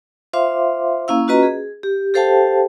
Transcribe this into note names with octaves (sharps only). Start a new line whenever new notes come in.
F4 C5 E5 F5 C6 D6
A#3 C#4 E4 F5 E6
C#4 F4 F#4 B4 D#5 A#5
G#4
G4
G4 A4 C5 F5 G5 A5